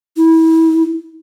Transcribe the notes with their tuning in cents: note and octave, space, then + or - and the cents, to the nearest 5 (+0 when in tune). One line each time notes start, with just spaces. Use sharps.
E4 -30